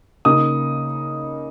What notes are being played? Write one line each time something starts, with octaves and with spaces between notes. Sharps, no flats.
C#3 A#3 D#4 D#6